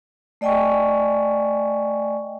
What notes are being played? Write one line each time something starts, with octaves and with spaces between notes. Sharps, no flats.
A3 D5 D#5 G5 G#5 C#6